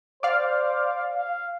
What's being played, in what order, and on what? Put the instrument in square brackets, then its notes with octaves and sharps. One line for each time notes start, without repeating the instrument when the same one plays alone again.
[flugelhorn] C5 [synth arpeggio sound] D5 F5
[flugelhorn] F5